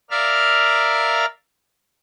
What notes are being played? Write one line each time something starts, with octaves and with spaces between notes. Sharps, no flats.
A#4 D5 E5 F5 F6